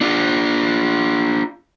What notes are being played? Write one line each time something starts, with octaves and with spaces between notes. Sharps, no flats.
D4 F4